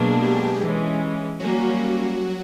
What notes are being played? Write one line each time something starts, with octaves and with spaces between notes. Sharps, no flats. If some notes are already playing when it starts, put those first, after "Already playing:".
Already playing: B2 F#3 G#3 A#3 D4 G#4
G3 G4
E3 G#3 C#4
F#3 G3 A#3 C#4 F#4